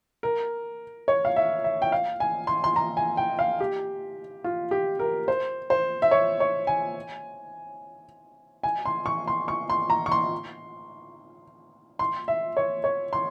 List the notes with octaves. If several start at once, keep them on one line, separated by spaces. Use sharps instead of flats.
A#4
C#5
F5
E5
E5
G5
F5
G#5
C6
C6
A#5
G#5
G5
F5
G4
F4
G4
A#4
C5
C5
E5
C#5
C#5
G#5
G#5
C6
C#6
C6
C#6
C6
A#5
C#6
C6
C6
E5
C#5
C#5
C6